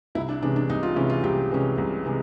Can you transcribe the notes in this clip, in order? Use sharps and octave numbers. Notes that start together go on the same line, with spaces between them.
C2 E4
D4
C3 E3 G#3 C#4 D4
D4
C2 D#4
F4
C3 E3 G#3 C#4 E4
F4
C2 G4
C3 E3 G#3 C#4
C2
C3 E3 G#3